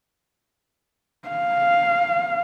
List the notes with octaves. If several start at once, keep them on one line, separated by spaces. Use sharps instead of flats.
F5